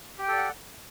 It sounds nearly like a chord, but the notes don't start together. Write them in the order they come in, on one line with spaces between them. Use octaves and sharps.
G4 G5 A4 D5 F#5